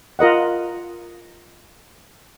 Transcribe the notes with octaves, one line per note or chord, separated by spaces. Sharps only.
F4 A#4 D#5 F#5